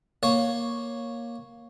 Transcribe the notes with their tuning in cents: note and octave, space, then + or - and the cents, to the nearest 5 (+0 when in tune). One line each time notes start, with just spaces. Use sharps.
A#3 +10 C#5 +0